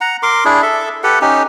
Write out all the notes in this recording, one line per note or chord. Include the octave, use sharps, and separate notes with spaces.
F#5 A#5
A#4 C6 D6
D4 E4 G#4
A4 E5
G4 A4 B4 F#5
C#4 D#4 G4